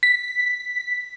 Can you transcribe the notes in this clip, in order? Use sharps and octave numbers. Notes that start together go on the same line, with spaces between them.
B6